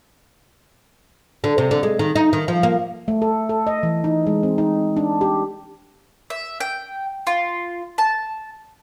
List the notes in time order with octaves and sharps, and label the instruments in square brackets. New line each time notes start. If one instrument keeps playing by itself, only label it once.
[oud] D3
C3
D3
G#3
D#3
D#4
D#3
F3
A#3
[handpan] A3
A4
A4
D#5
E3
D#4
G#3
C4
D#4
D4
G4
[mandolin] E5
G5
F4
A5